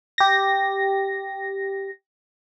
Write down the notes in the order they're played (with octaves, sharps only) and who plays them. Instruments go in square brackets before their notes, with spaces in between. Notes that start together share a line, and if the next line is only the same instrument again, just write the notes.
[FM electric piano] G4 A#6